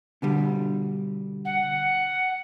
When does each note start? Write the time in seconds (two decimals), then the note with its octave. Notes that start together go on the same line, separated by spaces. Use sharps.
0.22 B2 D3 G3
1.45 F#5